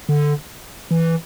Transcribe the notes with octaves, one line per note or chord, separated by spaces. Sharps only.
D3
E3